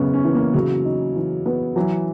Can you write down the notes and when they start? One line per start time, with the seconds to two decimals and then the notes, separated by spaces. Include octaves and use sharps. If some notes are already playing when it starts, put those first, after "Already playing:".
Already playing: F#2 C#3 G#3 B3 C#4
0.14 C#4
0.24 E3
0.34 A#3
0.54 C#3 F#3
0.85 D#4
1.16 E3
1.46 B3
1.76 E3 F#3